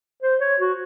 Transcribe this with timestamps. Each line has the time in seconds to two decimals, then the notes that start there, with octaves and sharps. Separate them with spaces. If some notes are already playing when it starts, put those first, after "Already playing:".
0.23 C5
0.41 C#5
0.60 F#4